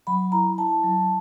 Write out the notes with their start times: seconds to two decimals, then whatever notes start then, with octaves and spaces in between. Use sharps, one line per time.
0.07 F#3 B5
0.32 E4 A#5
0.58 E4 A5
0.83 F#3